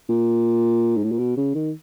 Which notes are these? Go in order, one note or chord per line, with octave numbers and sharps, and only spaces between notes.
A#2
G#2
A2
A#2
B2
C#3
D#3